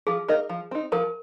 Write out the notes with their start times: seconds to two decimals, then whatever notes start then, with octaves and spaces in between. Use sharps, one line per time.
0.07 F3 G#4
0.28 A#3 D#4 A#4 D#5
0.49 F3
0.71 C4 D#4
0.92 F3 A#4